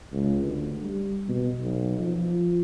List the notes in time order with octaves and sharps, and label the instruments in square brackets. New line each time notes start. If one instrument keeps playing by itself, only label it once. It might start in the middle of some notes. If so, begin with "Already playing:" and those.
[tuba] C#2
D2
G3
B2
B1
F3